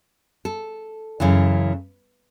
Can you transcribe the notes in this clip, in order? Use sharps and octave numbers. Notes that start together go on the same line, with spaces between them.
A4
F#2 C#3 E3